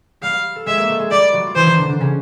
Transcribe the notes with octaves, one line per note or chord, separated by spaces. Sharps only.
G3 G4 F5
A4
G#3 G#4 E5
A#3 A#4
A3 A4
G#3 G#4
G3 G4 D5
F#3 F#4
F4
E3 E4 C5
D#3 D#4
D3 D4
D3 D4
C#3 C#4